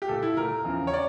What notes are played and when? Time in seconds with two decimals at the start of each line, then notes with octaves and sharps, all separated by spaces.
0.02 G4
0.08 A#2 A3 A4
0.22 E4
0.37 A#2 A3 A#4
0.64 E2 C#3 F3
0.87 C#5
0.93 C#3 D5